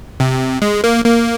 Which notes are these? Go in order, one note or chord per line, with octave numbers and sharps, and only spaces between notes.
C3
G#3
A#3
A#3